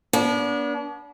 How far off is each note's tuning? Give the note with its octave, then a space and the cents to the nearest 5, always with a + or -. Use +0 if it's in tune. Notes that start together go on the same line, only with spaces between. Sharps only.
B3 -40 D4 -30